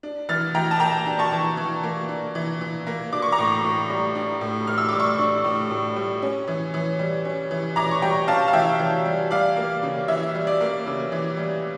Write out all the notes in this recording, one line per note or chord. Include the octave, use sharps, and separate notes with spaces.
D4
E3 F6 A6
E3 G5 A#5
A5
A#3 G5 A#5
D4
A5 C#6
E3
E3
A#3
D4
E3
E3
A#3
D4 D6
C#6
A#5 D6
A2
A2
G3
D4
A2
A2 F6
E6
G3 D6
C#6 E6
D4
A2
A2
G3
C#4
E3
E3
G3
C#4
E3
E3 A#5 D6
C#6
G3 G5 A#5
C#4 F5 A5
F5
E3 E5 G5
E3
G3
G3 D5 F5
A#3
C#3
E3 E5
G3
D5
A#3
C#3
E3
G3